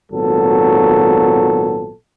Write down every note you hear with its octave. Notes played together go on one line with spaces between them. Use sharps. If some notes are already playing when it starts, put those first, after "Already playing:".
G#1 A#2 F#3 B3 A4